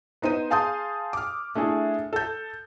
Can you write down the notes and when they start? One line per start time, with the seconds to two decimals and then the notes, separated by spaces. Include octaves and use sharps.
0.22 B3 D#4 C5 D#7
0.50 G#4 F5 A5 C6 D#6 G6
1.13 D6 F6
1.55 A3 D4 E4 G#4
2.13 A4 G6